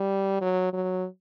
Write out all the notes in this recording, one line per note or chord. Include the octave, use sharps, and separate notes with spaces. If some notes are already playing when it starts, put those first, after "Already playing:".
Already playing: G3
F#3
F#3